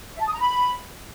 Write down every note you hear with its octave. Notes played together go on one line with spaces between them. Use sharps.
E5
A5
D#6
A#5
B5